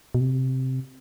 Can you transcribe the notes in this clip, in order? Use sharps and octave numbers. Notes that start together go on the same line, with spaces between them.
B2
C3